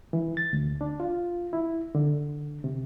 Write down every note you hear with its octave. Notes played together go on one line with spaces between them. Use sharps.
E3
A6
D2
D4
F4
E4
D3
C3